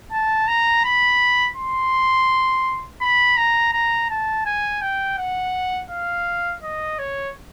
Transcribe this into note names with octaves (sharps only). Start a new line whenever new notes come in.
A5
A#5
B5
C6
B5
A#5
A#5
A5
G#5
G5
F#5
F5
D#5
C#5